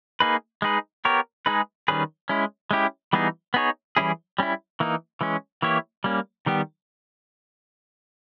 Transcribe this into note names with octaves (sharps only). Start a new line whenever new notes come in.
A#3 D#4 G#4 B4
G#3 D#4 G#4 B4
B3 G4 A#4 C#5
G#3 D#4 G#4 B4
D#3 G3 C#4 G#4 B4
G#3 C#4 E4
G#3 C#4 E4 G4
E3 G3 B3 D#4 G#4
B3 D#4 G#4 C#5
E3 G3 C#4 E4 G#4
G3 C#4 E4
E3 A#3 D#4
E3 G#3 C#4
E3 A#3 E4 G4 C#5
G3 A#3 C#4
D#3 G3 B3 G4